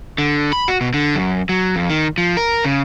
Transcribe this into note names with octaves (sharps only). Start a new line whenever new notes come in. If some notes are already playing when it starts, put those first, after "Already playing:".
D3
B5
F#4
B2
D3
F#2
F#3
F2
D#3
F3
A#4
C#3